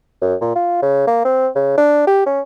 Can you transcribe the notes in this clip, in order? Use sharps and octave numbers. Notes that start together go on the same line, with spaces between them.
F#2
A#2
F4
C#3
A#3
C4
C#3
D4
G4
C#4